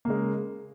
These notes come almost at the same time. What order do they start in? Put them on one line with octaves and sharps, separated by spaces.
A#3 C#3 G#3